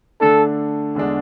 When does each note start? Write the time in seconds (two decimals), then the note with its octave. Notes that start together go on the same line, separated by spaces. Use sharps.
0.21 D3 A3 D4 A4
0.95 E2 D3 G#3 D4